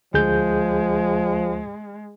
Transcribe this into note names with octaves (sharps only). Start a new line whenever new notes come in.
D2 F3 G#3 G#4 G6